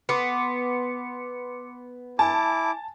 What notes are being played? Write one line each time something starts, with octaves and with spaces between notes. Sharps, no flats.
B3 C6 D6 C#7
E4 G#5 A5 D6